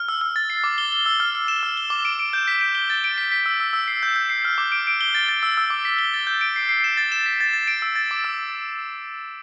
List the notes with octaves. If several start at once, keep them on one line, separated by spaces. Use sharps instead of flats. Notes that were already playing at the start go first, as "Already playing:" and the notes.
Already playing: F6
E6
E6
A6
C7
D6
G7
G7
E6
F6
F6
E7
E6
G7
D6
D7
D7
G6
B6
D7
G7
A6
D7
B6
B6
E6
E6
E6
C7
G6
G6
C7
F6
D6
D7
D7
G7
A6
A6
E6
E6
D6
B6
G7
A6
G6
D7
C7
C7
E7
A6
E7
B6
A6
A6
D7
E6
A6
D6
E6
E6